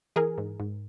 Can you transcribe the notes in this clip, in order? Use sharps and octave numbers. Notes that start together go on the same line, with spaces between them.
E3 G#4 A#4
G#2
G#2